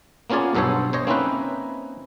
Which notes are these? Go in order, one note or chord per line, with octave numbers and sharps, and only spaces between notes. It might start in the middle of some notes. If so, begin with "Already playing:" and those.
A#3 B3 C#4 F4 G#4 D5
B1 G2 B3 A4 C5 C#5
C5 C#5 D#5
A#3 C4 C#4 D#4 E4 B4